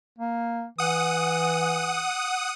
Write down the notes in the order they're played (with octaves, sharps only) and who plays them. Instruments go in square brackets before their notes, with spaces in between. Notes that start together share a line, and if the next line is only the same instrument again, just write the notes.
[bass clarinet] A#3
[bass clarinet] E3 [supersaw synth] F#5 D#6